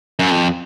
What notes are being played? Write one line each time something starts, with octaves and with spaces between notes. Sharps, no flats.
F#2
F2